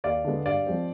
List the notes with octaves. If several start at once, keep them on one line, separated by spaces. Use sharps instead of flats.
D#2 D5 F5
D3 G#3 B3
G2 D5 F5
F3 G#3 C4